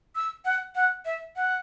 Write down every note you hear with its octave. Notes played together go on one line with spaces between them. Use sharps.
E6
F#5
F#5
E5
F#5